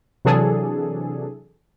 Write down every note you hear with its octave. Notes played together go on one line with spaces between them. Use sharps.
C3 E3 F#3 D4 G#4 A4